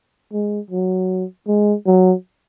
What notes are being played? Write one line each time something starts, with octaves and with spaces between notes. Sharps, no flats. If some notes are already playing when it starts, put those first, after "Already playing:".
G#3
F#3
G#3
F#3